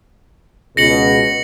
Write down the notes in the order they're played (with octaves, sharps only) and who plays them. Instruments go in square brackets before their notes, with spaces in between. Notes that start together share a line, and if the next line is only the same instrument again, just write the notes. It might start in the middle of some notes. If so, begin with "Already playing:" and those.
[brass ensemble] C#2 B2 [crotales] A#6 C#7 F#7